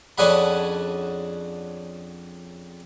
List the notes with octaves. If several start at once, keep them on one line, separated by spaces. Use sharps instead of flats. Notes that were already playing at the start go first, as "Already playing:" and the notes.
F2 C#4 D4 G#4 F#5 B5